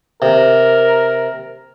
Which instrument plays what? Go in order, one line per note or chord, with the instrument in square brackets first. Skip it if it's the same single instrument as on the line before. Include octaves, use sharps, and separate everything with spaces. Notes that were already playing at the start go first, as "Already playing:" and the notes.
[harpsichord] C3 [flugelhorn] A#4